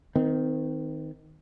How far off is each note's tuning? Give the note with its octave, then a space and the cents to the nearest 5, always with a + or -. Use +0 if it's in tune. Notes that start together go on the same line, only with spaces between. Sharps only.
D#3 +5 C4 -35